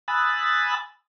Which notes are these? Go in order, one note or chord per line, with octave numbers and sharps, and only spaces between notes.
G#5 B5 D#6 E6 F#6 A6